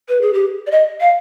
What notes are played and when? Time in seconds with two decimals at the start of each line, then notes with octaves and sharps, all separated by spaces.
0.09 B4
0.21 G#4
0.33 G4
0.67 D5
0.71 D#5
1.01 F5